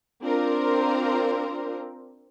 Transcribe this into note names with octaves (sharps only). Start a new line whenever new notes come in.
C4 D4 F4 A#4 C5